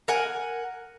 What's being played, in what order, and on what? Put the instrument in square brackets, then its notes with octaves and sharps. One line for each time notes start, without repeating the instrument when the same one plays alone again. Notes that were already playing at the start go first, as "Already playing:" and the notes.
[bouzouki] A#4 F#5 G#5